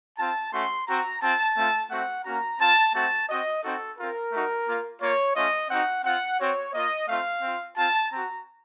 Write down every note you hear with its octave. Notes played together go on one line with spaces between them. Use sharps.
C4 F4 A5
A3 C#4 F#4 C6
C4 F#4 A#5
C4 F4 A5
A3 C4 F4
A3 C4 F#4 F#5
A#3 C#4 F#4 A#5
C4 F4 A5
A3 C4 F#4 A5
C4 F#4 D#5
C4 D#4 F#4 A4
C4 F4 A#4
A3 D#4 F#4
A#3 F4
A#3 F4 C#5
A3 C#4 F4 D#5
C4 D#4 F#4 F#5
C4 F4 F#5
C4 F#4 C#5
A#3 F4 D#5
A3 C4 F4 F5
C4 F4
C4 F4 A5
C4 F#4 A#5